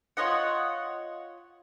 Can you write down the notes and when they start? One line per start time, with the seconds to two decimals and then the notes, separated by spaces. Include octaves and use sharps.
0.17 F4 C#5 D#5 F#5